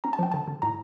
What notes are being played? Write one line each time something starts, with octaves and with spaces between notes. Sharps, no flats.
C#4 A#5
A5
F3 G5
D3 A5
D3
A2 A#5